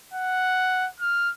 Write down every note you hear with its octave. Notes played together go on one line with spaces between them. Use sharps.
F#5
F6